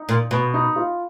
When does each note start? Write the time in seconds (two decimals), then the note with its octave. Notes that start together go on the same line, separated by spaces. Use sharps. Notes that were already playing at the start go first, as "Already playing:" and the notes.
Already playing: D#4
0.09 A#2
0.31 B2
0.54 D#4
0.76 F4